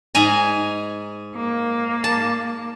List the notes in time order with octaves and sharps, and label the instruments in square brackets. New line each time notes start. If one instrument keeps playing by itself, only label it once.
[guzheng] G#2 G#5 A#5
[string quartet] A#3
[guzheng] A5